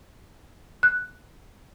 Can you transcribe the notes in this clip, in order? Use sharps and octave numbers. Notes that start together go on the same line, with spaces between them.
F#6